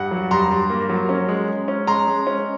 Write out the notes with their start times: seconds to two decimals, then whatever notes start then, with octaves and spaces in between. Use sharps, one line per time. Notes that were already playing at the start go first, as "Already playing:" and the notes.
Already playing: G2 F#5
0.11 F#3
0.31 G2 A#5 C6
0.51 G2
0.70 A#3
0.89 F#3
1.09 C#4
1.28 G#3
1.48 G#3
1.68 C#4
1.87 G#3 A#5 C6
2.07 G#3
2.27 C#4